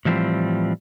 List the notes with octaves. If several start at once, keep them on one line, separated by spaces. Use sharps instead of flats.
A2 E3 F3 G3 C4